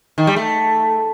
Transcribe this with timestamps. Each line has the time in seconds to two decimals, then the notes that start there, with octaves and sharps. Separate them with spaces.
0.18 D#3
0.27 G3
0.36 A3